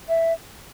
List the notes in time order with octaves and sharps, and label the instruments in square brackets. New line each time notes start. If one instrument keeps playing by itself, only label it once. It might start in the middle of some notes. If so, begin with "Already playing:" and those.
[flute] E5